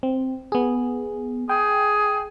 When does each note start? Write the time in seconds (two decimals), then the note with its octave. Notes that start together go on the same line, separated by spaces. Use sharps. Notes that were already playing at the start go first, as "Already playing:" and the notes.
0.03 C4
0.52 B3 G#4
1.49 G#4 G5